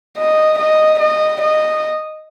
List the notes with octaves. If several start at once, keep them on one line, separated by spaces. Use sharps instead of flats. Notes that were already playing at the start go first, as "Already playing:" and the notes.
D#5
D#5
D#5
D#5